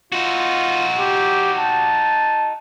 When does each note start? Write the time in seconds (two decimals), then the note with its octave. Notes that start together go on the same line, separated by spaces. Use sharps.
0.12 D#4 F4 F#4
0.99 G4
1.59 A5